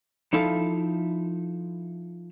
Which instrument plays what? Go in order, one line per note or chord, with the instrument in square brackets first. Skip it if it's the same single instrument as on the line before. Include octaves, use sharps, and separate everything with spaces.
[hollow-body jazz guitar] F3 D#4 E4 A4 F5